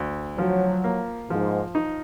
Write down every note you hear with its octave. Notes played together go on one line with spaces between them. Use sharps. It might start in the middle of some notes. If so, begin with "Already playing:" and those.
Already playing: D2
F3 F#3
A#3
G#2 F3
D#4